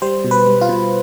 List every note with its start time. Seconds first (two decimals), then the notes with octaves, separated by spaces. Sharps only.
0.02 G3 C5
0.24 B2
0.31 B4
0.47 G3
0.61 F4
0.69 B2